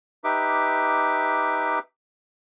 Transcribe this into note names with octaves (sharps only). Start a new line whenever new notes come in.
D#4 G4 B4 E5 D6